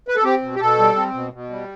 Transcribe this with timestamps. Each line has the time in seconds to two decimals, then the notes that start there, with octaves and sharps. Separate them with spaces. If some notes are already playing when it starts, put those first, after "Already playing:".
0.08 B4
0.16 A4
0.24 C4 G4
0.42 B2
0.55 G4
0.60 B2 A4
0.79 G3
0.96 C4
1.14 B2
1.33 B2
1.50 G3